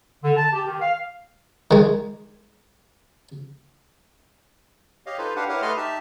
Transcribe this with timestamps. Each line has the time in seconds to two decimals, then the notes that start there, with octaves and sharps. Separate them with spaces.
0.24 D3
0.37 A5
0.53 G4
0.65 D#3
0.81 F5
1.71 D#3 G#3
5.06 G4 C#5 D#5 F5
5.18 D#4 F4 A4 B4 C5
5.36 D4 G4 B4 F5 F#5
5.49 E4 G4 A#4 B4 C#5 F#5
5.62 A3 A4 B4 D#5 C6 F6
5.77 D#4 G4 E5 A5